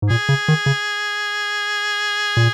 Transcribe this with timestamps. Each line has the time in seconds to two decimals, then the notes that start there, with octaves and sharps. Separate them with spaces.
0.02 G#2
0.09 A#2 G#4
0.29 C#3
0.48 D#3
0.66 C#3
2.37 A#2